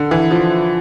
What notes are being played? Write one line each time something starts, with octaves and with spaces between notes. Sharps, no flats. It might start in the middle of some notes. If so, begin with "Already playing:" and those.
Already playing: D3
E3
F3